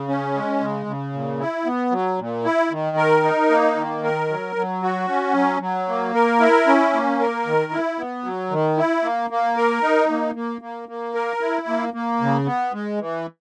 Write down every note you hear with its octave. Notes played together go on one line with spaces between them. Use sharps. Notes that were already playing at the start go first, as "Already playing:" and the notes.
Already playing: C#3
C#4
G#3
C#3
C#3
A#2
E4
B3
F#3
A#2
E4
D#3
A#4
D#4
A#3
D#3
A#4
F#3
F#3
F#4
C#4
F#3
F#3
A#3
A#4
E4
C#4
A#3
A#4
D#3
E4
B3
F#3
D#3
E4
A#3
A#3
A#4
D#4
A#3
A#3
A#3
A#3
A#4
E4
A#3
A#3
C#3
B3
G#3
E3